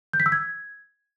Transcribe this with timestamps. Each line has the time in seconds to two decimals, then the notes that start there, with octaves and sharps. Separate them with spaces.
0.13 G6
0.20 B6
0.26 E6
0.32 G#6